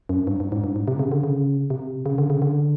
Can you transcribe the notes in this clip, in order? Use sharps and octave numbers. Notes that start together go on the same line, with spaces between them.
F#2
G2
G2
G#2
G2
G#2
C3
C#3
D3
C#3
C3
C#3
D3
C#3
D3